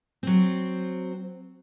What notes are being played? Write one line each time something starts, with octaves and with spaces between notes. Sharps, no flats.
F#3 C4